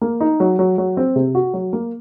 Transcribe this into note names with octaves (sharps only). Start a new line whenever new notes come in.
A#3
D#4
F#3
F#3
F#3
C4
C3
F#4
F#3
A#3